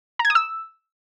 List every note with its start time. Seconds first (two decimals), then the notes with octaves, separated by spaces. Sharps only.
0.19 A#5
0.25 G#6
0.30 D#6
0.35 E6